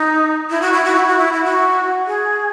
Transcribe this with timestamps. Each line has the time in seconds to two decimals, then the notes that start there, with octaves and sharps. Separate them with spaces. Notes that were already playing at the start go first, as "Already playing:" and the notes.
Already playing: D#4
0.50 E4
0.62 F#4
0.73 E4
0.85 F#4
0.95 E4
1.07 F#4
1.18 E4
1.33 E4
1.44 F#4
2.07 G#4